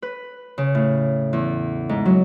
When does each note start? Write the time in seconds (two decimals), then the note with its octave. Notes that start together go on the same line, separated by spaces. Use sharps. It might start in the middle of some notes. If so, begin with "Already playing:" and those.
0.02 B4
0.58 C#3
0.75 A2
1.33 E2
1.89 G#2
2.06 F#3